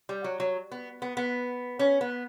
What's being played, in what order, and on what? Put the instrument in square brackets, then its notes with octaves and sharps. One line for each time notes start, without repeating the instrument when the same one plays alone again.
[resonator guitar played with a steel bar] G3
F#3
F#3
B3
B3
B3
C#4
B3